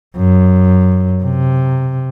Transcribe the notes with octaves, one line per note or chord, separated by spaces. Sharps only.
F#2
C3